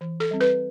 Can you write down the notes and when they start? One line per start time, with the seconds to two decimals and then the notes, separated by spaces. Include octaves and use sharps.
0.01 E3
0.20 A4
0.31 G3 C4
0.41 B4